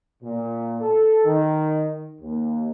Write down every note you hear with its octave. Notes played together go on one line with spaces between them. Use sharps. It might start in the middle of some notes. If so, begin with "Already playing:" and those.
A#2
A4
D#3
D#2